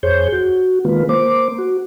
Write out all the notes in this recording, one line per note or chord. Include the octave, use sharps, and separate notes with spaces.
F2 G#4 C5 C#5 G6
F#4
D#3 G#3 A#3 F4 B4
A#3 C5 D6
F#4